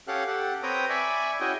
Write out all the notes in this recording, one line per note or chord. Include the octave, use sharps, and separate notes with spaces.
C#4 G4 A4 F5 F#5 F#6
G4 A4 F#5
C4 B4 C#5 G5 A#5 D#6
D5 E5 G#5 B5 C#6
C#4 E4 F#4 G#4 D#5 G5